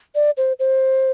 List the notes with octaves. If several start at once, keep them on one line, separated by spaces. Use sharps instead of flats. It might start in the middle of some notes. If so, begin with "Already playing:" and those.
D5
C5
C5